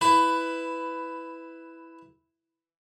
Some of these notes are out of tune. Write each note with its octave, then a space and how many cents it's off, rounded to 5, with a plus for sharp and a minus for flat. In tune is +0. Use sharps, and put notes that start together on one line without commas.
E4 +0 B4 +15